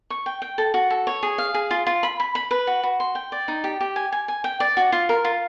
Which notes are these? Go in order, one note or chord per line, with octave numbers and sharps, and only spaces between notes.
C#6
G5
G5
A4
F#4
A4
C#5
G#4
F5
G#4
F4
F4
B5
B5
B5
B4
F#4
F#4
C6
G5
D5
D#4
G4
G4
G#5
G#5
G#5
G5
D5
F#4
F4
A#4
F4